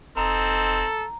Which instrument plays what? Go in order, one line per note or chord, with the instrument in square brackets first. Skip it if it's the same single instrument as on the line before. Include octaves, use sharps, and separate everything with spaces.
[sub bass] F1 [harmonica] C4 D#4 [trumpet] A4 [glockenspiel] A#5